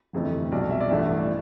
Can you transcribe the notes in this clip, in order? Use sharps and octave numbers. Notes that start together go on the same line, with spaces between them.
G1 F2 C3 E3 A3
B1 B2 G3 D5
E5
D5
A1 G2 E3 A3 E5
D5